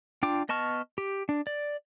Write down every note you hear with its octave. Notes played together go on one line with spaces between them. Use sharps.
D4 F4 G5 D6
B3 D#5 A5 C#6 F6
G4
D4
D5